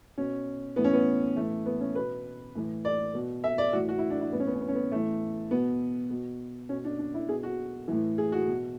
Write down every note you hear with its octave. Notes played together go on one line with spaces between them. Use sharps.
B2 C#4
A2 E3 B3
C#4
B3
A2 E3 A3
B3
C#4
B2 B4
A2 E3
D5
B2
E5
D5
A2 E3 F#4
F#4
E4
D4
E4
A2 E3 B3
C#4
B3
C#4
B3
C#4
B3
A2 E3 A3
B2 B3
B2
B2 C#4
D4
D4
E4
B2 G#4
F#4
A2 E3
G#4
F#4
B2